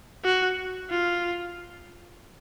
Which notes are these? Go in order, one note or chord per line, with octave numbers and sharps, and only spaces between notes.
F#4
F4